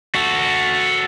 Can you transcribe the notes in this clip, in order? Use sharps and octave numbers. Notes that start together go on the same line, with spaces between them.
F#4 A4